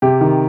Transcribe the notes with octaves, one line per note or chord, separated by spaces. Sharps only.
C3 G4
D#3